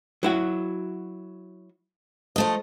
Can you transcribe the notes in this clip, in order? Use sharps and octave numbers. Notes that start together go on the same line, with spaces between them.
F#3 E4 F#4
F3 A3 D#5